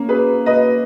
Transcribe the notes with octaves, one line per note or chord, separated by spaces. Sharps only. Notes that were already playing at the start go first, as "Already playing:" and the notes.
Already playing: A#3 C#4
G#4 B4
B4 D#5